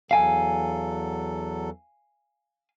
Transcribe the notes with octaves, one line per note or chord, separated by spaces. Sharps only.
E2 F#3 A4 F5 G#5